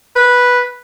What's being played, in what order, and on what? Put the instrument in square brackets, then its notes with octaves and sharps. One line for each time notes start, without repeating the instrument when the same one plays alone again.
[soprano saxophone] B4